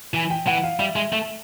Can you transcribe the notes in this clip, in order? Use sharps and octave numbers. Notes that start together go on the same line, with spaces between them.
E3 G#5
G5
E3 F#5
F5
G3 E5
G#3 E5
A3 E5